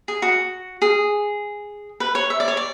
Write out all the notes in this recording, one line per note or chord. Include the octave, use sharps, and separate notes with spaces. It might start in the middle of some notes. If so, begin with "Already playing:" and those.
G#4
F#4
G#4
B4
C#5
E5
D5
C#5
D5